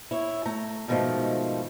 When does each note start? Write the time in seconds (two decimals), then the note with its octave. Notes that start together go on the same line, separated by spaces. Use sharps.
0.11 E4 C#5
0.46 A3 A#5
0.88 G#2 B2 D#3 F3 A3